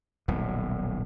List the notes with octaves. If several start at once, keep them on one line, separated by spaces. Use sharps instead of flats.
D#1 B1 A2